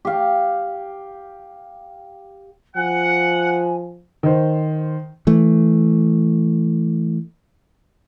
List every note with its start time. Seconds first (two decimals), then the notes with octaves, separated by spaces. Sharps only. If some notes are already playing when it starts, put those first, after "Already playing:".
0.05 G4 F5
2.76 F3 F#5 G#5
4.23 D#3 C5
5.27 E3 A3